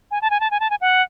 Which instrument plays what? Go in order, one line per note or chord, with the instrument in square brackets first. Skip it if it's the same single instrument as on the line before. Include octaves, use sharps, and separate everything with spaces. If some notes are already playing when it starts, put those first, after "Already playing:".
[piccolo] G#5
A5
G#5
A5
G#5
A5
G#5
F#5